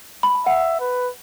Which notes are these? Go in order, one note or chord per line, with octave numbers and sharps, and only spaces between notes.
B5
A5
E5 F#5
B4